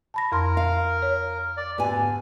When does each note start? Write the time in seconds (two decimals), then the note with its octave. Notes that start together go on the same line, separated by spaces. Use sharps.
0.14 A5 B5 A#6
0.32 F2 A#4 C6
0.57 F5
1.02 C#5
1.57 D5
1.78 D2 G#2 B3 G#5